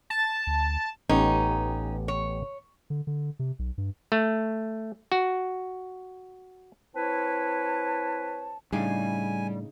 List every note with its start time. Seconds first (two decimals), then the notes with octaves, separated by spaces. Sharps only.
0.10 A5
0.47 D2
1.09 A1 B3 C#4 D#4 G4
2.08 C#5
2.90 D3
3.07 D3
3.39 C3
3.59 B1
3.78 G2
4.12 A3
5.12 F#4
6.95 C4 E4 B4 C#5 A5
8.73 A2 C#3 G3 D4 D#4 G#4 G#5